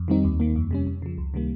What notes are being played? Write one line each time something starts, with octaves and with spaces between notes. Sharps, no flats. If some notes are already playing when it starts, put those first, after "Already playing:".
Already playing: F2
D#3 G3 C4 D#4
D#2
D#3 A#3
F2
C3 G3 C#4
F2
C#3 F3
C#2
C3 D#3 G3 A#3